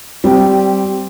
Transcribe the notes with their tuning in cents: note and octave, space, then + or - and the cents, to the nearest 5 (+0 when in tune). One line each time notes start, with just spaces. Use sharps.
G3 -15 C4 +0